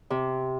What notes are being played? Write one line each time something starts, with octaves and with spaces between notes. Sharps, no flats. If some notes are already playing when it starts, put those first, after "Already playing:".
C3